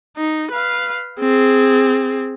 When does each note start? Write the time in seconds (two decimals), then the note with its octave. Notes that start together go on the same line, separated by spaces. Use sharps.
0.17 D#4
0.52 B4 F5
1.20 C4 G#4